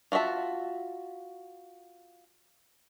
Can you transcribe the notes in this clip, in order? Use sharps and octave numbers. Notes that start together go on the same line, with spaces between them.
F4 F#4 A4 E5 A5